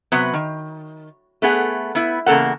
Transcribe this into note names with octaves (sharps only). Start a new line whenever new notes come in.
C3 F#3 B3
D#3
A3 B3 G#4 F#5
B3 E4
E2 C#3 A#3 A4 A#4 F#5